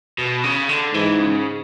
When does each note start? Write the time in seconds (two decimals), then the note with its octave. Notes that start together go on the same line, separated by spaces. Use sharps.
0.18 B2
0.44 C#3
0.69 D3
0.94 G#2 E3
1.19 C#3